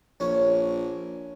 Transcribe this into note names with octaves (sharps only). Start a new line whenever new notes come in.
A#1 C#4